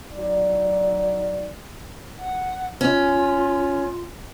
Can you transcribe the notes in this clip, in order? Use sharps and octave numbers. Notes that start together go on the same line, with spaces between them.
F#3 D#4 D5
F#5
C#4 F4